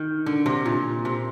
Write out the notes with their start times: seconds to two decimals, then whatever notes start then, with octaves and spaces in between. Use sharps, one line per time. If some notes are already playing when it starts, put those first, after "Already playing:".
Already playing: D#3
0.26 D3
0.46 C3
0.65 A#2
1.05 C3